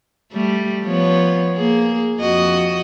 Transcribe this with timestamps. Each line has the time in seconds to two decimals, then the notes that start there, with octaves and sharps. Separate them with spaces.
0.32 G3 A3
0.83 F3 B3 C#5
1.56 A#3 G#4
2.20 F2 F#4 D#5